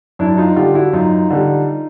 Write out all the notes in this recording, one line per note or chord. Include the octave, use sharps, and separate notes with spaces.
F#2 D4 E4
E4
D#4 F4
D3 G3 F4 G4
E4 F#4
F#2 D#4 F4
D3 G3